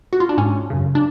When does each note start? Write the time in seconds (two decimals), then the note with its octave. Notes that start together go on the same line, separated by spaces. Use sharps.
0.13 F#4
0.20 F4
0.29 D4
0.37 G#2 C#4
0.70 F#2 C#3
0.95 D4